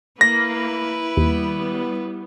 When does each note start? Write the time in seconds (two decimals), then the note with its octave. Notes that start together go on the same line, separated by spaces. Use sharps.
0.21 A#3 E4 B4 A#6
1.17 D#2 G3 B3